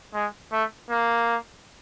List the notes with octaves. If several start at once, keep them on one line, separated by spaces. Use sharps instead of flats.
G#3
A3
A#3